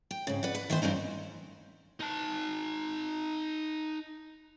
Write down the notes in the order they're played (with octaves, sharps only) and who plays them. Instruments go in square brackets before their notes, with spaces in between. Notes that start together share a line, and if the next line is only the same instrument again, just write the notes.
[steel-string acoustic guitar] G5
G#2 C#3
B4 D5 F#5
B4
D#3 E3 B3 C5
G2 C4 C#4 D#4
[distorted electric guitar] D#4 A5